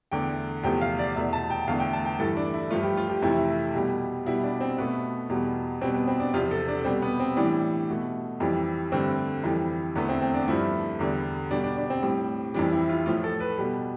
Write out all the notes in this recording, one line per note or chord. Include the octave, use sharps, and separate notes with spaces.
E2 D3 A3 G5
E2 C3 F3 A3 G5
F5
D5
E2 B2 A3 E5
A5
G5
E2 D3 A3 F5
G5
A5
G5
G2 E3 A3 A4
D4
E4
G2 F3 A3 F4
G4
F4
G4
F2 C3 E3 A3 E4
B2 G3
B2 G3 E4
D4
C4
B2 A3 B3
E2 B2 G3
B2 G3 C4
B3
C4
D4
E2 C3 F3 F4
A4
D4
B2 G3 C4
B3
C4
A2 E3 G3 D4
B2 A3
F2 E3 G3
G2 D3 A3 C4
F2 E3 G3
E2 D3 A3 B3
C4
C4
D4
G2 F3 A3 E4
E2 D3 G3
B2 G3 D4
D4
D4
C4
A2 G3
F2 E3 G3 D4
E4
F4
A2 F3 A3 F4
A4
B4
B2 G3